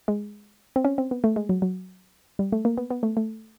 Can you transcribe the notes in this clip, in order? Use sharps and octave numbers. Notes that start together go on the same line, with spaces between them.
G#3
C4
C#4
C4
B3
A3
G#3
F#3
F#3
G3
A3
A#3
B3
B3
A3
A3